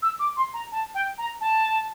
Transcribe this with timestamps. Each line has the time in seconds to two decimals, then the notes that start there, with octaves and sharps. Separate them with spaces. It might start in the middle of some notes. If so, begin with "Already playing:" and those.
0.02 E6
0.19 D6
0.37 C6
0.54 A#5
0.72 A5
0.94 G5
1.18 A#5
1.41 A5